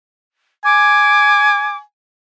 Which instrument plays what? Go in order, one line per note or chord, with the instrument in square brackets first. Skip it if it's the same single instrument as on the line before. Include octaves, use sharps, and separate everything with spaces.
[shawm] G#5 [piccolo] D6